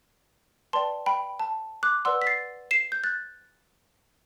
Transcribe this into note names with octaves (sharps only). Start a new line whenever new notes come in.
B4 D5 G5 A5 C6
G5 B5
A5
D6 F#6
B4 D5 F#5 C6 E6
B6
A6 C7
C7 E7
G6
F#6 A6